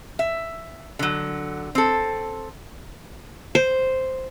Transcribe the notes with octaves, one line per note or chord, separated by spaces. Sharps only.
E5
D3 F#3
C4 A4
C5